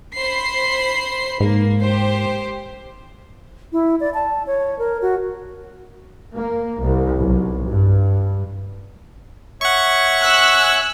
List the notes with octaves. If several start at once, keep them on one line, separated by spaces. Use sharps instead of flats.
C5 B5 C7
G#2 A#3
G4 C5
E4
D5
A5
C#5
A#4
F#4
A#3
C2
B1
G2
C#5 E5 F#5 C#6
G#5 E6 F#6